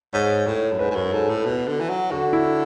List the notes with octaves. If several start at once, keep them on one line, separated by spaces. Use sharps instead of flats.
G#2 C#5
A2 C#5
F#2
G#2 B4
G#2
F#2 C#5
G#2 A4
A2
B2
D3
E3
F#3
D3 F#4
E4